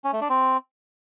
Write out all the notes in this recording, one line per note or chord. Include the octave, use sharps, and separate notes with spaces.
C#4
A3
D4
C4